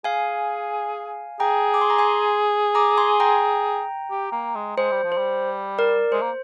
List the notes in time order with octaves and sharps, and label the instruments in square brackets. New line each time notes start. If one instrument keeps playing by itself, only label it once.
[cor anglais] G#4 [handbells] F5 G#5
[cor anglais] G#4 [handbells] G5 A#5
[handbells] D6
C6
A#5
G#5 C6
A#5 D6
G#5 C6
G5 A#5
[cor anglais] G4
A#3
G#3
[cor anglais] G#3 [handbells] C5
[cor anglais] G3
F3
[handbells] C5
[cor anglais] G3
[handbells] A#4 D5
[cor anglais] G#3 [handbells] C5
[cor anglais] A#3